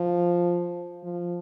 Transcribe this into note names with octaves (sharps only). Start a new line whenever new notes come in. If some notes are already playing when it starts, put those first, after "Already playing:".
Already playing: F3
F3